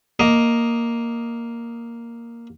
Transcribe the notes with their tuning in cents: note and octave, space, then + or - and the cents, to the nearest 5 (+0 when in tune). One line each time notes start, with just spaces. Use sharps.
A#3 +0 D#5 +0